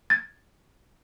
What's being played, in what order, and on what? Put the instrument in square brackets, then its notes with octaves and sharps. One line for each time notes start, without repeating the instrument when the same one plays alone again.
[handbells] G#6 A6